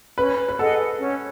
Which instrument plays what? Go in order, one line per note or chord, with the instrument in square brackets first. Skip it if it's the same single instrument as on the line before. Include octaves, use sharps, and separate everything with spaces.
[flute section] C#4 [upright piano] B4
[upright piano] B4
[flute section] G#4 D#5 F#5 [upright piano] A4
[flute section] C#4